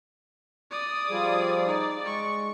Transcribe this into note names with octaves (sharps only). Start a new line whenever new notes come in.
D5 D#6
F3 G3 G#4
D#4 D5
G#3 C#6